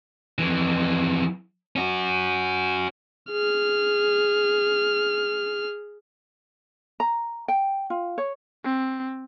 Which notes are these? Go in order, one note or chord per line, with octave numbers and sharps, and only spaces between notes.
F2 E3
C#4 F#4
G#4 F6
A#5
G5
F4
C#5
C4